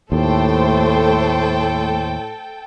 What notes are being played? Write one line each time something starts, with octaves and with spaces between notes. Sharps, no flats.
D#2 A2 A3 A4 C5 G5